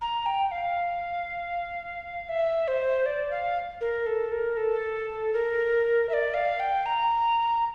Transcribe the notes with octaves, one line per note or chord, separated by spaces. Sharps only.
A#5
G5
F5
E5
C5
D5
F5
A#4
A4
A#4
A4
A#4
E5
D5
F5
G5
A#5